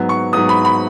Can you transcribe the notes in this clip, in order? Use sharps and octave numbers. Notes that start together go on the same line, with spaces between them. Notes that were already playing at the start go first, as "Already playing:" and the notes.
Already playing: G#2 F#3 B3
C#6
G#2 F#3 B3 D#6
B5
B5